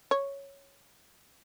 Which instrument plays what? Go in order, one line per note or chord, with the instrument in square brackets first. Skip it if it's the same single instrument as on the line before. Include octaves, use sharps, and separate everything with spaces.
[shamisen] C#5